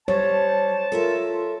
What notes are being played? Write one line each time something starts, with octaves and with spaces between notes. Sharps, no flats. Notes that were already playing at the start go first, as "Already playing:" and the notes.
G3 C5 C#5 A5
F4 A4 A#4 E5